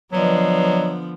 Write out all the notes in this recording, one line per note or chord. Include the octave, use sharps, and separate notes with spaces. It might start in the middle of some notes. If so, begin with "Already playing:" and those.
D3 F3 F#3 B3 B4 D5 D#5